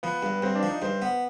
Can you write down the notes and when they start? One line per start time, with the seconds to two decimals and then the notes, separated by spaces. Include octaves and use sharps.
0.03 F3 B3
0.23 G2
0.42 G2 C4
0.55 D4
0.63 F3
0.69 D#4
0.82 G2 C5
1.02 B3